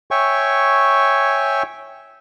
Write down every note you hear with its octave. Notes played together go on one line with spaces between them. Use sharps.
C#5 E5 G5 G#5 C#6